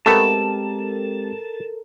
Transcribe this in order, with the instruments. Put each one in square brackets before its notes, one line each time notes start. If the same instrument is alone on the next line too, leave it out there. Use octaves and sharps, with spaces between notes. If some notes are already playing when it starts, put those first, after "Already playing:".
[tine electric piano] G#3 C4 G4 [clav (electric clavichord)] A3 B3 [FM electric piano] A4 A#4 [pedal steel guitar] A5